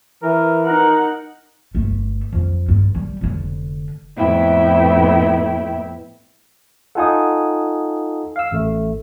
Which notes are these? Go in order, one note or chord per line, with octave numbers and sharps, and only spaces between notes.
E3 A#4
D#4 A#4 F#5
G1 A3
F2
G2
G3
F1 D3
F2 A2 B3 E4 E5 G5
D#4 F4 A4 F#5 G#5 D#6
F5 E6
A1 A3